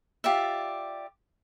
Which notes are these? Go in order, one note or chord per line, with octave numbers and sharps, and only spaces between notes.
F4 G4 D5 E5